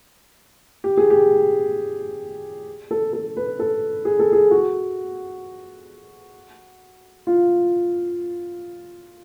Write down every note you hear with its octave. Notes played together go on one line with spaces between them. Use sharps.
G4
G#4
G4
A4
A4
B4
A4
G#4
A4
G#4
F#4
F4